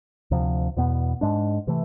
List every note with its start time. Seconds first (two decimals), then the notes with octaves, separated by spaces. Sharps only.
0.31 D2 C3 F3
0.77 E2 B2 B3
1.21 G#2 G#3 D4
1.67 C3 E3 A3